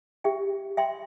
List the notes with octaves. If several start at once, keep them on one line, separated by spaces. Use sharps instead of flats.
G4 E5 G5
E5 G5 C6